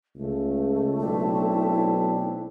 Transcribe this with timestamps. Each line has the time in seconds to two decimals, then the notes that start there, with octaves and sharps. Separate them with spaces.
0.16 C#2 A3
1.01 B1 C4 D4 E4